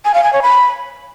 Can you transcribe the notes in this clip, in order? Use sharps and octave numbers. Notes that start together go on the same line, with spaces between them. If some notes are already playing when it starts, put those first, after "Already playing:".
G#5
F5
G#5
C#5
B5